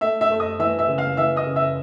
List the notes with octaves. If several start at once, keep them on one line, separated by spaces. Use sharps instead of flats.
A3 E5 E6
E5 E6
A3
D#5 D#6
E3 E5 E6
E5 E6
C#3
F5 F6
E3 E5 E6
D#5 D#6
C#3
E5 E6